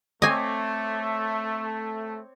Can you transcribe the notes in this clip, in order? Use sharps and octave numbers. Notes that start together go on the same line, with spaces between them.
A3 C4 C#5 D#5 G#5 D6